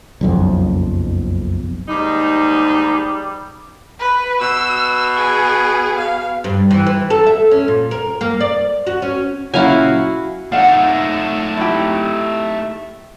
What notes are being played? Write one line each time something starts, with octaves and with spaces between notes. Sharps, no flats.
F#1 B1 F2
D#2 G#2 G3 D#4
B4
B2 E6
G#4
F5
G2
E3
E3
A4
E5
C#4
A#2
A#4
A#3
D5
F#4
C#4
A#2 C#3 F#3 E4 F#4 F5 G#5
A3 D#4 F5 F#5
E4 G4